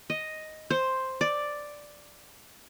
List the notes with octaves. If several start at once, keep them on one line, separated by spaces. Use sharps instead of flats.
D#5
C5
D5